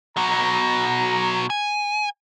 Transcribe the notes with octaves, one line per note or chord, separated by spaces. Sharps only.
B2 F#3 A#5
G#5